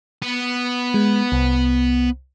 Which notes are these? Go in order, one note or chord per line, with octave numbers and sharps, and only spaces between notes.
B3
G#3
C2